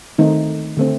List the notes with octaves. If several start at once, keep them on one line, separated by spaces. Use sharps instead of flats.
D#3 A3 C4 D#4
D3 A3 C4